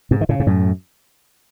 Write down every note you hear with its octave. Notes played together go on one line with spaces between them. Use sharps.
G#2 C3
D#3
A2 C#3
G#2
F#2 A2